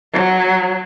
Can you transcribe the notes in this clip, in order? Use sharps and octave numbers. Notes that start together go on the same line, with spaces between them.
F#3